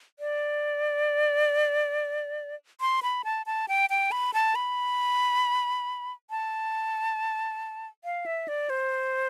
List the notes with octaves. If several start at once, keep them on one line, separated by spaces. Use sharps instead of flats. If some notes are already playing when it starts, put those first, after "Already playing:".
D5
C6
B5
A5
A5
G5
G5
B5
A5
B5
A5
F5
E5
D5
C5